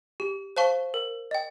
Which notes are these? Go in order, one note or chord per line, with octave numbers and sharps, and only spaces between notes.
G4
C5 F5 A5 C#6
A#4
D#5 G5